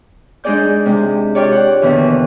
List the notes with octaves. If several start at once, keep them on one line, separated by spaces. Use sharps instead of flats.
G#3 D4 D#4 G#4 D5 G6
C3 G#3
F4 G4 C#5 D5
F#5
D#2 B2 D3 E3